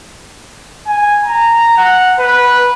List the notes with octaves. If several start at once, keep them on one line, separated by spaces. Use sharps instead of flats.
G#5
A#5
F#5
B4